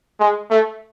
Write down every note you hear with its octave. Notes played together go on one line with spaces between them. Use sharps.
G#3
A3